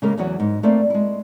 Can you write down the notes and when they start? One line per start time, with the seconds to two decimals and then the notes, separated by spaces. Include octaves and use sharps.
0.02 C#3 G#3 A#3 C#4 G4 A#4
0.17 E2 E3 F#3 B3 F#4 C#5
0.40 G#2
0.63 A3 A#3 C4 C5 D5 E5
0.90 G#3 E4